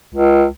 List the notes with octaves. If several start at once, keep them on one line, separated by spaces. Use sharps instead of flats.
C#2